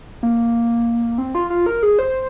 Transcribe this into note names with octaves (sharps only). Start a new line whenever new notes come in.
A#3
C4
F4
F4
A#4
G#4
C5